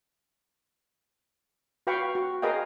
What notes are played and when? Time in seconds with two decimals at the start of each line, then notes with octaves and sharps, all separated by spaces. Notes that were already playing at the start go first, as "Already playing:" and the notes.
1.87 F#4 B4 F5 G5 B5 C#6
2.15 F#4
2.42 G#4 A#4 B4 D#5 F5 G5